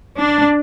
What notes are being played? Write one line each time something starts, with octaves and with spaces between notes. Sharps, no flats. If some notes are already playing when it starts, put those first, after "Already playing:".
D4